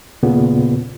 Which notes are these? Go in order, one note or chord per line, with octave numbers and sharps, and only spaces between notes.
D#2 A#2 C#3 B3